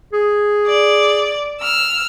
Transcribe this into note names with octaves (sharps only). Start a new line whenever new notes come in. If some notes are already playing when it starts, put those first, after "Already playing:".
G#4
D5
E6 F6